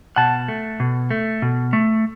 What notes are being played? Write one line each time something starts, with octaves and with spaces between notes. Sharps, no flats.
B2 F#5 A5
A3
B2
A3
B2
A3